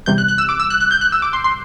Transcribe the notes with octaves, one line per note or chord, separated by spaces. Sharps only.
E2 C3 G3 G6
F#6
F#6
E6
D6
E6
F#6
F#6
G6
F#6
E6
D6
C6
C6